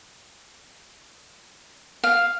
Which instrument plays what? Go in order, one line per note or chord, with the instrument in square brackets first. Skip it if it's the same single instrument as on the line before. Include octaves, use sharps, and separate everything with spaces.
[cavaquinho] F5